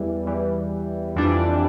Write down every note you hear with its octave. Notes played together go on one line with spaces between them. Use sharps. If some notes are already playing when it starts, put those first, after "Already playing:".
Already playing: E2 E3 G3
E2 E3 G3
F2 E3 G3 D4